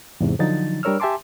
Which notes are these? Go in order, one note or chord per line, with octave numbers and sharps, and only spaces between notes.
E2 G#2 C3
D3 F3 F#3 D#4 A6
G3 D4 A#4 C#5 E6 F6
G4 E5 G#5 A5 C6 D6